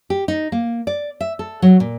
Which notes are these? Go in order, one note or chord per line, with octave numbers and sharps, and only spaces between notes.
G4
D#4
A#3
D5
E5
A4
F#3
A#2